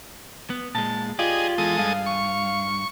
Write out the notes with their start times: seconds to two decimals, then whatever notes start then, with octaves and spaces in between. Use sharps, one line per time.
0.50 B3
0.75 A#2 G#3 A5
1.19 F4 G4 G#4 D5 D#5
1.58 E2 G#3 A4 D#6
1.79 G2 F5
2.06 C#6